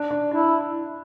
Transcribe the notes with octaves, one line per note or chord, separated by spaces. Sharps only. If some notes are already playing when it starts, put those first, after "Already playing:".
Already playing: D4
D4
D4 E4